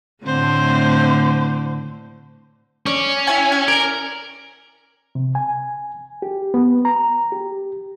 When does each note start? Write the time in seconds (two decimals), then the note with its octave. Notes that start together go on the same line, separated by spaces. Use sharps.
0.24 A2 D3 A3 C4 C5
2.86 C#4 D5
3.27 E4 C#5 G#5
3.52 G#5
3.68 A#4 D5
5.15 C3
5.35 G#5
6.22 G4
6.54 B3
6.85 A#5
7.32 G4